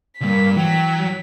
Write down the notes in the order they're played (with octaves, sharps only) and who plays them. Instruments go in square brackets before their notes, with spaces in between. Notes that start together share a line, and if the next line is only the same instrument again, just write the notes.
[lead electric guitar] C#2 G2 [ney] A#3 [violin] B6
[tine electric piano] E3 [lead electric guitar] F#3 [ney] G5